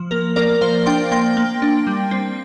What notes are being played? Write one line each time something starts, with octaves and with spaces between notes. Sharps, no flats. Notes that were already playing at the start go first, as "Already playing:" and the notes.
Already playing: F3
A#3 A#4
A#3 A#4 D5
F3 C5 F5
D4 G5 C6
A#3 G5 C6
A#3
D4
G3
C4